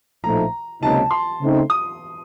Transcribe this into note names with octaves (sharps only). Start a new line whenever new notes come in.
A#1 A2 F3 A3 D#4 A#5
C#2 C3 F#3 A#3 D#4 A5
C6
C#3 A3 C4 D#4
D#6